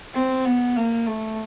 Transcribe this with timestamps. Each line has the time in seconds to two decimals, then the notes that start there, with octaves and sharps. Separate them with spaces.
0.14 C4
0.45 B3
0.76 A#3
1.07 A3